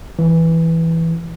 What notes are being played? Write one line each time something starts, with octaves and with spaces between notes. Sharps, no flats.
E3